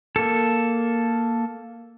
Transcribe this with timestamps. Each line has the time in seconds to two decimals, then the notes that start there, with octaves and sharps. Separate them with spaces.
0.16 A#3 A4